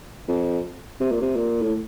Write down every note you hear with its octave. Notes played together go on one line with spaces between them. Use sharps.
F2
C3
A#2
C3
A#2
A2